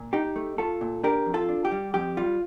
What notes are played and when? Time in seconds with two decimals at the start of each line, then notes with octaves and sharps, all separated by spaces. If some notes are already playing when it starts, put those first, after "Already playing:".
Already playing: A#2
0.13 D#4 G4
0.36 A3
0.58 A3 F4 A4
0.81 A#2
1.04 D4 G4 A#4
1.26 F2
1.34 F4 A4
1.49 D4
1.65 G4
1.72 G3
1.94 F2 G4
2.17 G3 F4